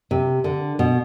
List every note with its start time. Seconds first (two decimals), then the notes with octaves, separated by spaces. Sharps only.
0.11 C3
0.44 D3
0.79 B2